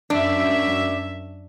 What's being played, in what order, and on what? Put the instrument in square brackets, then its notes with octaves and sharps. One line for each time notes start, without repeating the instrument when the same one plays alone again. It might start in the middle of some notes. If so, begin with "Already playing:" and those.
[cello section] F#2 E5 [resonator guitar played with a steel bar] D4